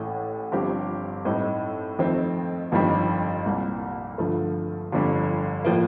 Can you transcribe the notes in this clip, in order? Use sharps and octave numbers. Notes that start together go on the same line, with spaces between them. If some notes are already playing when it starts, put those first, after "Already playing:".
Already playing: A1 A2 A3
G1 G2 F3 C4 G4
A2 G3 C4 D#4 A4
F2 D#3 A3 C4
G1 F2 D#3 G3 D4
C2 A#2 G3
G2 D3 F3 A3
G1 F2 D3 G3
A2 F3 A#3